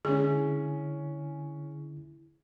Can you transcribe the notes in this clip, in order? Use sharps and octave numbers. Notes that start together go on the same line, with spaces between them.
D3 G#3 C#4 E4 G#4